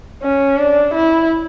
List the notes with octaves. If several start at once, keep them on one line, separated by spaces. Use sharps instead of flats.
C#4
D4
E4